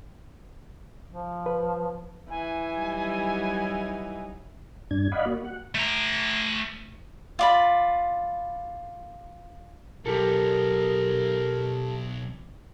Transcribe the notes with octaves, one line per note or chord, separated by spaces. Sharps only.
F3
B4
E3 G#5
F#3 G3 D#4
G2 D4 G#6
D5 D#5 F5 F#5 B5
A#3 F#4
F#5
A3 A#5
F4 D5 B5
B1 G4 A4 A#4